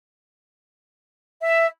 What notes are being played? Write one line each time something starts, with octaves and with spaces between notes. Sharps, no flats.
E5